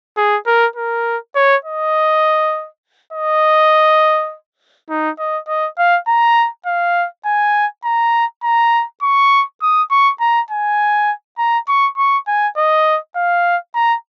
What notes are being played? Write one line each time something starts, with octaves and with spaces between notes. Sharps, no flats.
G#4
A#4
A#4
C#5
D#5
D#5
D#4
D#5
D#5
F5
A#5
F5
G#5
A#5
A#5
C#6
D#6
C#6
A#5
G#5
A#5
C#6
C#6
G#5
D#5
F5
A#5